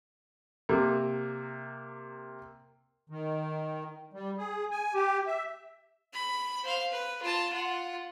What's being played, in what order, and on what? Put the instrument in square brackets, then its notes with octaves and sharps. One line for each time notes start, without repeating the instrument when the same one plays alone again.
[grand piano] C3 A#3
[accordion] D#3
G3
G#4
G#5
G4
E5
[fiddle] B5
C5 F5
B4
F4 A5
F4 F#5